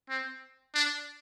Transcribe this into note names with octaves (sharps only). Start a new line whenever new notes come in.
C4
D4